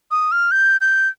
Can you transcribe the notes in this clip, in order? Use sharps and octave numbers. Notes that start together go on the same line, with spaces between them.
D#6
F6
G6
G6